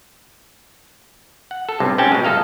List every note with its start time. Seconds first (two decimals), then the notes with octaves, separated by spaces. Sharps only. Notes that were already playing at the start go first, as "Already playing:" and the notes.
1.51 F#5
1.69 A4
1.80 B1 G2 C3
1.98 G#2 C4 C#4 F#5 G5 A5
2.12 B2 G#3
2.24 G1 A3 A4 D#5 F5 A#5